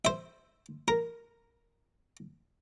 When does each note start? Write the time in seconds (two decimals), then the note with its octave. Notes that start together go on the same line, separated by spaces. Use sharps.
0.05 C5 E5
0.88 A#4